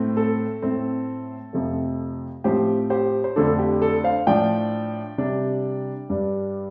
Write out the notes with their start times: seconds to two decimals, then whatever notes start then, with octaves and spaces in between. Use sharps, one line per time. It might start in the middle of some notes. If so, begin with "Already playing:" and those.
Already playing: A2 A3 C4
0.17 A4
0.62 A2 A3 C4
1.53 F2 C3 F3 A3
2.44 A2 F3 C4 G4 C5
2.90 G4 C5
3.24 C5
3.36 F2 D3 F3 A3 D4 A4
3.59 G4
3.82 A4
4.04 C5 F5
4.27 A2 F3 D4 D5 G5
5.18 C3 G3 D4
6.10 G2 G3 D4